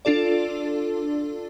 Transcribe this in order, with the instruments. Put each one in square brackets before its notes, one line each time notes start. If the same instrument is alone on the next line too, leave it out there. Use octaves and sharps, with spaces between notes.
[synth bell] D4 F4 A4 D5